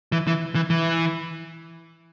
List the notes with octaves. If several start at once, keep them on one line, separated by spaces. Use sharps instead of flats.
E3
E3
E3
E3